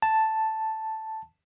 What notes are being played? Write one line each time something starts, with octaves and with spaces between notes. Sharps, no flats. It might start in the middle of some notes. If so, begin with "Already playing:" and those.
A5